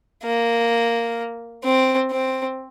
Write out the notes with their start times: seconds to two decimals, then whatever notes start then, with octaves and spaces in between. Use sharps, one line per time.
0.24 A#3
1.64 C4
2.11 C4